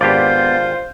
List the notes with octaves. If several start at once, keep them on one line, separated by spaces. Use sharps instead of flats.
G#1 B3 D4 F4 G4 C5 D5